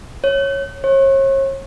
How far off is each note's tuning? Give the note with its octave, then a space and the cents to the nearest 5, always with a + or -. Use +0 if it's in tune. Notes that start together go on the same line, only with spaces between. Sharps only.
C#5 -10
C#5 -40